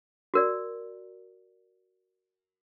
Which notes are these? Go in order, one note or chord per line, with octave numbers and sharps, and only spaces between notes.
F#4 A#4 D5